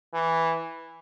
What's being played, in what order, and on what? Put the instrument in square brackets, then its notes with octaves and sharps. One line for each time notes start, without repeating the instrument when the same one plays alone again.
[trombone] E3